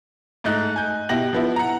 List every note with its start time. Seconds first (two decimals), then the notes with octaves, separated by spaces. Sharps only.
0.44 G#2 A3 D#4 F#6
0.76 G#5 G6
1.09 B2 E4 G4 A#6 F#7
1.33 F3 B3 E4
1.56 F#5 A#5